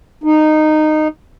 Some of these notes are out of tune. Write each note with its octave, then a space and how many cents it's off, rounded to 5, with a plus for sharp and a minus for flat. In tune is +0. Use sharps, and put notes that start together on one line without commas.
D#4 -15